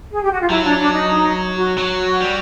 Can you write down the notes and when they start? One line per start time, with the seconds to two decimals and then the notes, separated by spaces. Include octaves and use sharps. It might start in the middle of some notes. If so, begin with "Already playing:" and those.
0.12 G#4
0.22 G4
0.31 F#4
0.41 F4
0.49 F#3 E4
0.64 D4
0.78 D4
0.92 D#4
1.56 F#4
1.78 F#3
2.20 G3